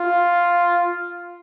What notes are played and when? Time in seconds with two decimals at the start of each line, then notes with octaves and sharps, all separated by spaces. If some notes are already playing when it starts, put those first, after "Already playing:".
Already playing: F4